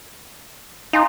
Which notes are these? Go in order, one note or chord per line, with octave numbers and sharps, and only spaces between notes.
D#4 F5 G#5 C6